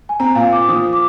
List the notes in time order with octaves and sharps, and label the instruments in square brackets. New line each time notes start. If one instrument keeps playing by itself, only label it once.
[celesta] G#5
[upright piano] C4 [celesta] A#5
[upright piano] A#2 [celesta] F5
[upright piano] A#2 [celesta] D6
[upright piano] F3 [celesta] D#6
[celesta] D6